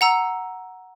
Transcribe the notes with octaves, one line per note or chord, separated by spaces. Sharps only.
F#5 A#5 E6